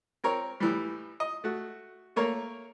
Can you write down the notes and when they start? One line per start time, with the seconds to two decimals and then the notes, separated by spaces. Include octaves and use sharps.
0.24 C4 A#4 C#5
0.60 A2 E3 G3
1.20 D#5
1.44 A3 F#4
2.16 A3 A#3 A#4 C#5